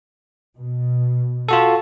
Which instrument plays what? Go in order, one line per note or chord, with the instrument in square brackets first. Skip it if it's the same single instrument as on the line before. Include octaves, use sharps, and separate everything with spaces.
[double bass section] B2
[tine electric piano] F4 F#4 A4